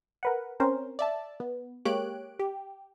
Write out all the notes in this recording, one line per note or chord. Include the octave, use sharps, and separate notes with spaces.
A#4 B4 F#5
C4 C#4 A#4 C5
D5 E5 A5
B3
G#3 A#3 G4 C#5 F#6 D7
G4